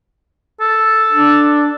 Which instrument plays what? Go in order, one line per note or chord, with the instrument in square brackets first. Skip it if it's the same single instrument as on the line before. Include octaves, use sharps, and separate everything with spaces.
[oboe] A4
[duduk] D4